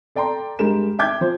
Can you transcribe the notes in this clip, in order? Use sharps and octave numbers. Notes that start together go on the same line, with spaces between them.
A4 D5 G5 A#5 C6
G2 G#3 G4 A#4 E7
E5 G5 D6 G6 G#6
F3 C5